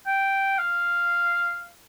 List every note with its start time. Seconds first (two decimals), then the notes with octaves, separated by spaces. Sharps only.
0.07 G5
0.58 F5